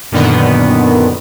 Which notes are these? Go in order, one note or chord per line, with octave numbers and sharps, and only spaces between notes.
F#2 A#2 D3 D#3 B3